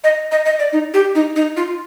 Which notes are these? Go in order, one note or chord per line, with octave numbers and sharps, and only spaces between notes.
D#5
D#5
D#5
D5
D#4
G4
D#4
D#4
F4